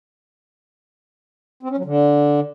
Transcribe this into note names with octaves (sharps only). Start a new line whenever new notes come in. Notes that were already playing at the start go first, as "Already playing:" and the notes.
C4
C#4
F#3
D3